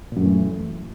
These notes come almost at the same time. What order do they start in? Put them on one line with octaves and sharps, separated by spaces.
A#2 F#2 A3 E3